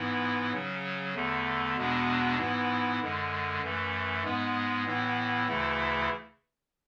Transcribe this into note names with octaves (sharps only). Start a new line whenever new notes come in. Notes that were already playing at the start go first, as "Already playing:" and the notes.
Already playing: G#2 E3 B3 E4
C#3 F#3 C#4
E2 D3 A3
E2 B2 G#3 B3 D4
G#2 E3 B3 E4
F#2 D3 G#3
F#2 E3 A3
G#2 G#3 B3
A2 E3 B3 E4
D2 C#3 E3 A3 E4